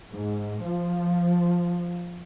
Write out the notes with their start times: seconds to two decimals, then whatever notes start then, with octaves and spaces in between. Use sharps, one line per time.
0.11 G#2
0.62 F3